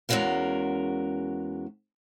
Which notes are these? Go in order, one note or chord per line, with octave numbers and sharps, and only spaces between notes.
E2 G#3 C#4 F#4 A#4 F5